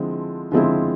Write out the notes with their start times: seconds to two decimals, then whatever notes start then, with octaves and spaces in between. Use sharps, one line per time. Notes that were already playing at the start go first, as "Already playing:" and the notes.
Already playing: D3 F3 G#3 C4 E4
0.52 D3 F3 G#3 C4 E4